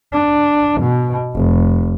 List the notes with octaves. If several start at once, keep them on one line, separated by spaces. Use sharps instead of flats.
D4
B2
F1